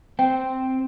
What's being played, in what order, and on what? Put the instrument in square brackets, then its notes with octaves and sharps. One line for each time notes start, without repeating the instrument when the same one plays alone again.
[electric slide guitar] C4 [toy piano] G5